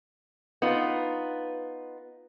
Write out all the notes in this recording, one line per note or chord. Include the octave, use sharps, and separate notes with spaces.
B3 D#4 F4